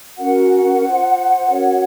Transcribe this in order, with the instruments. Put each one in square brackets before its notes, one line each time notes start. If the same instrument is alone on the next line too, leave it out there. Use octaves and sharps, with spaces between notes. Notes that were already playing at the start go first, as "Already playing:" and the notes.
[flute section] C#4 F#4 A#4 F#5
F4 C5
C#4 F#4 A#4 C#5